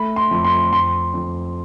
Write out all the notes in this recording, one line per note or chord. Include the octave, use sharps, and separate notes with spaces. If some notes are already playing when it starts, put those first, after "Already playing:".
Already playing: A3 B5
C6
F2
C6
F2 C6
F2